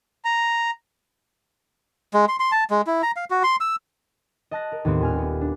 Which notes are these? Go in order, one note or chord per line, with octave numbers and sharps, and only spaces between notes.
A#5
G#3
C6
C6
A5
G#3
E4
A#5
F5
F#4
C6
E6
D#5 A5 F#6 A#6
A#4
D#2 A2 B3 C4
D#1 G#5 F6
B3
D4